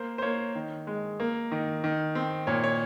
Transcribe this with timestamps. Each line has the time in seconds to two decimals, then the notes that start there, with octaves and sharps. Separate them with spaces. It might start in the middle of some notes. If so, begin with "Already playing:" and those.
Already playing: A#3 C5
0.18 C5
0.22 A#3 C#5
0.55 D#3
0.87 G#3
1.20 A#3
1.52 D#3
1.84 D#3
2.15 C4
2.47 A#2 C#5
2.64 C#5